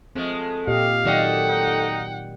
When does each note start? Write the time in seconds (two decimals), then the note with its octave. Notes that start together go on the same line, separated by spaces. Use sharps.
0.15 F3 G#3 A3 C4
0.67 A#2 G4 D#5 F5
1.05 D#3 F#3 A3 D5 D#5 F#5 G5
1.50 D#4